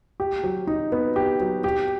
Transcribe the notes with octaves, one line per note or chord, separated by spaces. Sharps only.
G4
F#3
D#4
B3
G4
F#3
G4